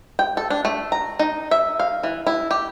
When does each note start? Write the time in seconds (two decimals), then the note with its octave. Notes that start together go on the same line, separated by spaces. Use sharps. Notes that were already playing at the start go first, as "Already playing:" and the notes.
0.19 G5
0.37 A4
0.50 D4
0.65 A3
0.92 A#5
1.19 D#4
1.51 E5
1.79 F5
2.03 E3
2.27 E4
2.51 G4